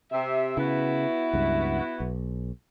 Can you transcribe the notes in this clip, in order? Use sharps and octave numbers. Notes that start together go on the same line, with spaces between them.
C3 E5
C#3 B3 E4 F#4
C#2 G2
B1